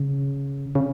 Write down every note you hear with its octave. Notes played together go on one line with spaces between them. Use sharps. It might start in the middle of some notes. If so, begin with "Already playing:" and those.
Already playing: C#3
C#3